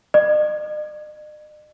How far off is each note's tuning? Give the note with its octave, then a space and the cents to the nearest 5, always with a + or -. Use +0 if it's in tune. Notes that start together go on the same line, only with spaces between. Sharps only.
D#5 -45